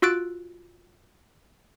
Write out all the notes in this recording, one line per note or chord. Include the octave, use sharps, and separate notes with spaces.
F4 F#4 E6 F#6 A6 D7